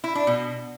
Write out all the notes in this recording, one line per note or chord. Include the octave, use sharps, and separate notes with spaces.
E4
D4
B2